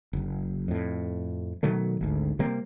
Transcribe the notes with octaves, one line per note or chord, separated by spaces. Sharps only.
F#1
F2 A2
B2 D#3 F#3 A3
G#1 D2
C3 G3 A#3 C4